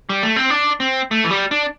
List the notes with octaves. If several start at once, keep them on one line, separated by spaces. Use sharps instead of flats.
G3
A3
C4
D4
C4
A3
E3
G3
D4